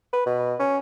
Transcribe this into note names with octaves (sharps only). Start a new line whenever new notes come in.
B4
B2
C#4